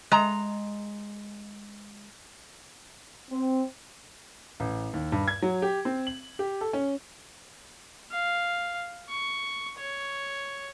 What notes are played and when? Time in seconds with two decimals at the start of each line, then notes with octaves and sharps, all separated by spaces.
0.12 G#3 A#5
3.30 C4
4.60 A1
4.93 D#2
5.12 G2
5.28 G#6
5.42 F#3
5.62 G4
5.85 C4
6.07 F#7
6.39 G4
6.61 A4
6.73 C#4
8.12 F5
9.09 C#6
9.78 C#5